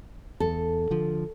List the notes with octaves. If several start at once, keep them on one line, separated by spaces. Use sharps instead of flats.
E2 A4
D3 F3